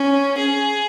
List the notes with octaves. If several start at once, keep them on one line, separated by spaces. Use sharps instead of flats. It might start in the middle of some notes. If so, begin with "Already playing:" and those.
Already playing: C#4
G#4